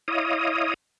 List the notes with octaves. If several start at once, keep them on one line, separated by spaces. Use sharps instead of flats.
E4 C#5 D#5 F5 D#6